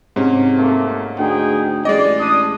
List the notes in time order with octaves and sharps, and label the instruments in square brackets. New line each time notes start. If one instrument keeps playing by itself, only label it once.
[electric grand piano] G#2 C#4 [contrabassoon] C3
[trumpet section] A3 A#3
[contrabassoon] D2 [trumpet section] D#4 G#4 G5
[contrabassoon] A1 [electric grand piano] G#3 D#5 [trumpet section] D5
[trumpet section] D4 D#6